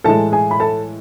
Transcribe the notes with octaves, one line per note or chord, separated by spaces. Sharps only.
A2 E3 G#3 A4 A5
G#4 G#5
B5
A4 A5